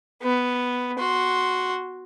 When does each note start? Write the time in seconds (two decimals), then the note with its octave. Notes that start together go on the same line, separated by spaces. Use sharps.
0.23 B3
0.99 F#4 C6